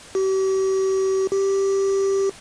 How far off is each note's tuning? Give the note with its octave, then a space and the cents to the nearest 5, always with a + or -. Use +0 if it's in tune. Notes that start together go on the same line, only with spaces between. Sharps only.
G4 -40
G4 -5